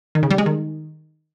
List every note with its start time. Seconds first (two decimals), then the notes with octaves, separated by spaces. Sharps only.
0.15 D#3
0.23 C#3
0.31 G3
0.38 G#3
0.46 D#3